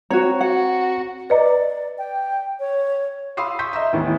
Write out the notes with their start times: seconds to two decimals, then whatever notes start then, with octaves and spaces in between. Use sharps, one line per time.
0.11 C4 F#4 C#5 A#5
0.41 F#4 F#5
1.30 B4 D5 D#5 A#5
1.98 G5
2.60 C#5
3.37 F5 B5 C6 D#6 E6 C7
3.59 C6 C#6 G6 B6
3.73 D#5 E5 A#5 C6
3.93 D#2 A2 D#3 E3 B3